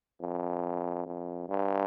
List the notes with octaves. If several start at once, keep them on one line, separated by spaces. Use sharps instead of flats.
F2
F2
G2